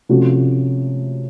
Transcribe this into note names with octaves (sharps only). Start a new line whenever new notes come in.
C3 F3 A3 C#4 F#4